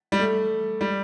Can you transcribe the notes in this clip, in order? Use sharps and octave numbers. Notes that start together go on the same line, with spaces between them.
G3
A3
G3